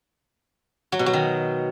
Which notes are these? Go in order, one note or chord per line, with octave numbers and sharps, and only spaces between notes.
F#3
B2
F#3
D#3